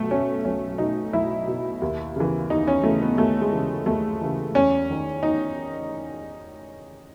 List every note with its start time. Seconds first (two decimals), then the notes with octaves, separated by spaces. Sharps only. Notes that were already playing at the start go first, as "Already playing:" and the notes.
Already playing: B1 B2 A3
0.10 B2 C#4
0.45 B1 C#4
0.78 B2 D#4
1.13 B1 E4
1.48 B2
1.82 D#2
2.16 C#3 E3
2.50 D#2 D#4
2.68 C#4
2.83 C#3 E3 A3
3.01 B3
3.18 D#2 A3
3.41 G#3
3.52 C#3 E3
3.86 D#2 A3
4.21 C#3 E3
4.55 E2 C#4
4.90 D#3
5.23 D#4